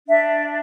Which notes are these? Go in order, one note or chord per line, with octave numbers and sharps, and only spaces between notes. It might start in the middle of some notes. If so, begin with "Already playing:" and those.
D4 E5